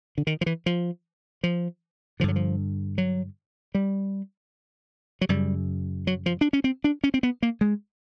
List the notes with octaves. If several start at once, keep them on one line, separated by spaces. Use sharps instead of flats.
D3
D#3
F3
E3
F3
F3
G2 D3 F3
F#3
F3
F#3
G3
F#3
F#2 C#3 G3
F#3
F3
D4
C#4
C4
D4
C#4
C4
B3
A#3
G#3